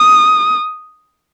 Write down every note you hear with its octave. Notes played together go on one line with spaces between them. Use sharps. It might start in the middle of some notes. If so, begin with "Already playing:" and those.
Already playing: D#6